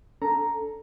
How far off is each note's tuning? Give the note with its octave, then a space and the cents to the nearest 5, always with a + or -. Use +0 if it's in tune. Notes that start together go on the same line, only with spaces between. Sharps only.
D4 -30 A4 +0 A#5 +0